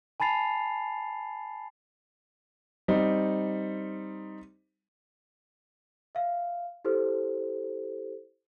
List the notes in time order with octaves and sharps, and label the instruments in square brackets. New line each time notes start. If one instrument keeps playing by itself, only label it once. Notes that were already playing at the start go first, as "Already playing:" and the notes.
[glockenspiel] G#5 A5 B5 A6 C7 F7
[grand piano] G3 C4 D#4
[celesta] E5 F5
E4 G4 A4 C5